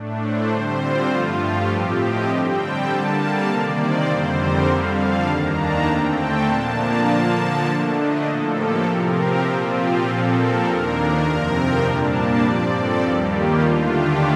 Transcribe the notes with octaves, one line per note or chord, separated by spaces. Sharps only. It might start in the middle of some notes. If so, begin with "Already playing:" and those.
Already playing: A2 A3 D4
C5
D3 G3 C4 C5
F4
G2 F3 A3
G4
A2 F3 C4 G4
D#5
D3 G3 C4 G5
A5
D3 G3 A#3 A5
F5
C3 D#3 A#3 D5
C5
F2 D3 G3 C4 C5
A#4
F2 D3 G3 F5
A5
D#2 D#3 A#3 D4 A#5
A5
D3 A3 C4 G5
A5
A#2 F3 A#3 D4 A5
A#5
D3 F3 A#3 A5
D3 A3 D4
D#5
A2 F3 A#3 A4
G4
C3 F3 C4 A#4
G4
A#2 F3 C4 F4
G4
A#2 F3 C4 A4
A#4
D#2 D#3 A#3 D4
F2 C3 F3 C4 A#4
G5
A#2 G3 A#3 D4 A5
D5
G2 F3 C4 D5
A4
D#2 D#3 G3 A#3 G4
F4
D#2 D3 A3 D4
G4